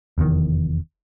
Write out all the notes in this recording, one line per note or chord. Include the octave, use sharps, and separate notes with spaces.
F1 E2 C3 D#3